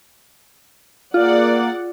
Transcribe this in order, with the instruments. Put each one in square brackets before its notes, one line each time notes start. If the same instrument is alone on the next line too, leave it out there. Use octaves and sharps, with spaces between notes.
[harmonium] A#3 [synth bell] F4 [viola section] G#4 D5 F#5